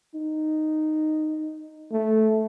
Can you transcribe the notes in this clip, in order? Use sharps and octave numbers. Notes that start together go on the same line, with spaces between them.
D#4
A3